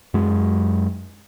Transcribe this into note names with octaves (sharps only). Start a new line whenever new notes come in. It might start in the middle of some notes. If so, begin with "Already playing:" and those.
F#2 F#3 G#3